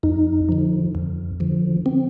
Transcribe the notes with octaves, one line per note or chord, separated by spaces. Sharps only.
F2 D#4
D3 F3
F2
D3 F3
C4